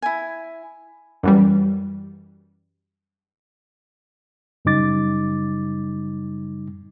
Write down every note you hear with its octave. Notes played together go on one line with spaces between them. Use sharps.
E4 G#5
F#2 E3 G3
F#2 C#3 G3 D#4 D6 A6